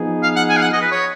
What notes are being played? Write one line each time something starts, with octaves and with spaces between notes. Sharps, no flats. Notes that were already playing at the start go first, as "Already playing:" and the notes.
Already playing: F3 B3 D#4 G#4
F5
F#5
G#5
F5
F#5
D#5
B4
C#5